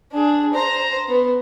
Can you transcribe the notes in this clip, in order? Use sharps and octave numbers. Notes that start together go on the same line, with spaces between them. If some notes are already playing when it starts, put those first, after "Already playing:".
D4 G#4
C5 A#5
B3